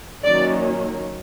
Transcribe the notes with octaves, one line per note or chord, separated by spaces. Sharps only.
D#3 F#3 A#3 C#4 D5